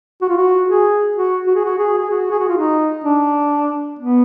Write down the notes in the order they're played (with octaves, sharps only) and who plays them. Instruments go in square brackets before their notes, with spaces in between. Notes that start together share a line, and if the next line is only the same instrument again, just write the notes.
[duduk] F#4
F4
F#4
G#4
F#4
F#4
G#4
F#4
G#4
G#4
F#4
G#4
F#4
F4
D#4
D4
B3